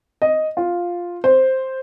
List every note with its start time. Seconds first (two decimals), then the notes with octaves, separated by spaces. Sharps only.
0.22 D#5
0.57 F4
1.24 C5